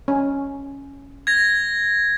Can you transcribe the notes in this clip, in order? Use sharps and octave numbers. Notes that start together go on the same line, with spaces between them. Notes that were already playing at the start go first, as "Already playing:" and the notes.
C#4
G#6 A#6